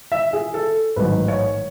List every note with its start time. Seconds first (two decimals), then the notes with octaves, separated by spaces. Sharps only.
0.12 E5
0.33 G#4
0.54 A4
0.96 A1 G#2 D#3 F#3 B4
1.28 C#5